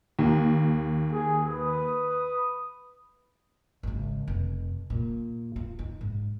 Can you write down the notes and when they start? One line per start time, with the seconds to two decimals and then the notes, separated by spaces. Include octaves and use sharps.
0.19 D#2
1.12 G#4
1.46 B4 D#6
3.83 G#1 C#3
4.28 F1
4.90 A#2
5.56 F4
5.79 D#4
6.01 G#2